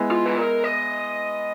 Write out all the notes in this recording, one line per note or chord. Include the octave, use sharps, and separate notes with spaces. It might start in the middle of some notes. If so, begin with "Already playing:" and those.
Already playing: G#3 B3 E4
F4
B4
A#4
D#5